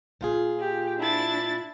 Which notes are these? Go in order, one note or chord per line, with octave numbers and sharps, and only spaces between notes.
A#2 F4 G#4
G4
D4 E4 A6